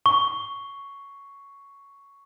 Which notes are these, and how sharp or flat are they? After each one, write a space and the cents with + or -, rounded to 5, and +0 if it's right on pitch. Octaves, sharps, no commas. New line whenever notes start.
C#6 +5